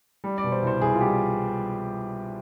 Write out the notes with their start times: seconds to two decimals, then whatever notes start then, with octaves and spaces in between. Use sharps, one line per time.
0.24 G3
0.38 D5
0.44 B2
0.52 C5
0.62 C2 C5
0.81 C2 G#4
0.95 F4
1.01 G3 G4